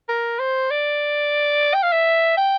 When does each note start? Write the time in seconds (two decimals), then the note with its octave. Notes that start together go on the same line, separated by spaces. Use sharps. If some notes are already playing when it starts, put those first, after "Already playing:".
0.08 A#4
0.39 C5
0.70 D5
1.74 G5
1.82 F5
1.92 E5
2.37 G5